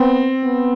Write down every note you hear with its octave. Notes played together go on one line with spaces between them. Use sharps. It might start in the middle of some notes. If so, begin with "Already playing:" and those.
Already playing: B3 C4
B3